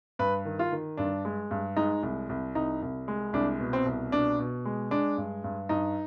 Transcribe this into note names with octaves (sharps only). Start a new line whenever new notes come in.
G2 B4
D#3
F4
D#3
G2 D4
G#3
G2
G#3 D#4
C2
C2
C2 D#4
C2
G#3
C2 D4
B2
C4
C2
B2 D4
B2
G#3
G#3 D4
G2
G2
G2 D#4